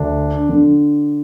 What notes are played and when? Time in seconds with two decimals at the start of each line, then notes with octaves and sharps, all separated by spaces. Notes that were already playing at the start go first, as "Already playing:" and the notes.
Already playing: D2 D3 D4
0.49 D3